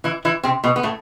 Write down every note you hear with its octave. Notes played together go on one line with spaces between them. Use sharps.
E3 E4
E3 E4
C3 C4
B2 B3
B3
A2 A3